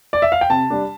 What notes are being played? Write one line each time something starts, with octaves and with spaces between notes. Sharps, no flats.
D5
E5
F5
G5
C3 A5
G3 D4